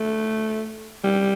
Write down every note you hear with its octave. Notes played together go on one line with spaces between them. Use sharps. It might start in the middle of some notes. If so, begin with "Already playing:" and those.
Already playing: A3
G3